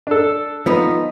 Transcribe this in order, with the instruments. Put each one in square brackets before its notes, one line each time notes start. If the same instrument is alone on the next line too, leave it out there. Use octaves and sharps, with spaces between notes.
[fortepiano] D4 A4
[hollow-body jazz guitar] F3 B3 D#4